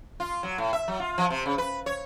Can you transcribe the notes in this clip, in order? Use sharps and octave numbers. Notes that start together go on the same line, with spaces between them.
F4
F#3
A2
E5
F#3
F4
F3
C3
C#3
B4
C#5